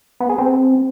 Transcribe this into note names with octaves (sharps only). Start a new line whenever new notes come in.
B3
G#4
C4